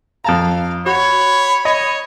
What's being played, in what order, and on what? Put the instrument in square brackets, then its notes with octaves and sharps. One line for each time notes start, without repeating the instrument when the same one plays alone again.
[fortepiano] F2 A5 A#5 [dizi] F5
[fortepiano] F#4 [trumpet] C#5 [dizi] B5
[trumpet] C#5 [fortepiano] D#5